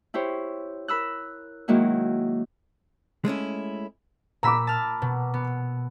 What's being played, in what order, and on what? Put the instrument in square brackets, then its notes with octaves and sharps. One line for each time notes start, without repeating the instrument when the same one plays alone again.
[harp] E4 G4 C5 C#5
A#4 B5 E6 F#6
D#3 F#3 G#3 A#3 E4 F#4
[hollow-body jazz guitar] G#3 A3 C#4 E4
[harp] A#2 E6 B6 [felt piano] A#5 B5 D6
[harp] A5 F6
B2
B3